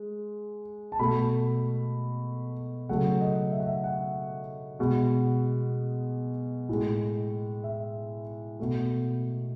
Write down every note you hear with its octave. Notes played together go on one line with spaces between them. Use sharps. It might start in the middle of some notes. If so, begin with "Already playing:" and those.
Already playing: G#3
A5
B2 A3 B5
C#3 F#3 A3 F#5
D#5
E5
F#5
E5
F#5
B2 G#3
A2 G#3
E5
B2 A3